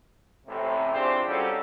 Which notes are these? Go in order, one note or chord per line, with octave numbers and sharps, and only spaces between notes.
A1 A2 C3
C4 D4 F4 G4 G#4 C5
G3 C#4 D#4 F#4 G4 A4